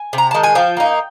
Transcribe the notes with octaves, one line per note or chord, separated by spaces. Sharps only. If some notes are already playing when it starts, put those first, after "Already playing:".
Already playing: G#5
C3
A#5
D#3 G#3 A5
G#5
F3 G5
A#3 D#4